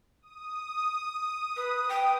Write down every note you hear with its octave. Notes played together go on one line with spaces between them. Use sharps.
D#6
B4
G5